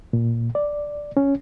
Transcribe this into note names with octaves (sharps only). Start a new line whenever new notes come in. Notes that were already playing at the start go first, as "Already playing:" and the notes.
A#2
D5
C#4